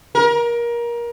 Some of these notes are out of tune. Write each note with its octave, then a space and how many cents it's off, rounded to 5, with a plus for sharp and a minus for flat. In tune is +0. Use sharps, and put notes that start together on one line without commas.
A#4 +25